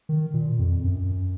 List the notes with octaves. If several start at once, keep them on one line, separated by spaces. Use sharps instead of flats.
D#3
A#2
F2
F#2